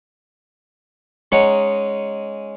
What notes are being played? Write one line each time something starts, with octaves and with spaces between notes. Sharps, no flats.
G#3 C#4 D#4 C#5 F#5 A#5